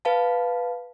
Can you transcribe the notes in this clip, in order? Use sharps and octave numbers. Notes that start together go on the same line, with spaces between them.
B4 F5 A5